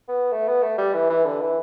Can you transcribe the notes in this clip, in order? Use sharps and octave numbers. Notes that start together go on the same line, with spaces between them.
B3
A3
B3
A3
G3
E3
E3
D3
E3